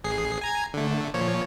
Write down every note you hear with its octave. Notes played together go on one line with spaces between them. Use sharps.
A1 G#4 C7
G#5 A#5 G#6
D3 A3
A#2 F3 C#5